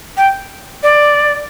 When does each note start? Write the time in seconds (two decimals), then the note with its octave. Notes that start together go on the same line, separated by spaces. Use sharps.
0.17 G5
0.83 D5